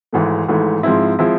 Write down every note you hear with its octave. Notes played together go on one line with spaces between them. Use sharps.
G#1 G#2 E3 A3
G#1 G#2 E3 A3
G#2 F3 G#3 C4 E4
F3 G#3 C4 E4